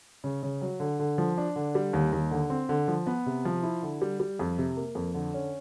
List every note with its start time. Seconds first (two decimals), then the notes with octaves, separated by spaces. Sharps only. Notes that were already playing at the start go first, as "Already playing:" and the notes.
0.24 C#3
0.43 C#3
0.62 F#3
0.80 D3
1.00 D3
1.18 F3
1.38 D4
1.56 D3
1.75 G3
1.93 D#2
2.13 D#2
2.31 D3
2.50 C4
2.69 D3
2.88 F3
3.07 B3
3.26 C3
3.45 F3
3.63 E4
3.83 D3
4.02 G3
4.20 G3
4.39 F2
4.58 C3
4.77 A#3
4.95 F2
5.14 D3
5.34 C#4